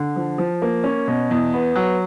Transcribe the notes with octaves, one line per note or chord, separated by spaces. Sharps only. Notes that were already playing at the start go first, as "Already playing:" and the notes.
Already playing: D3
F3
F3
A#3
C#4
B2
E2
B3
F#3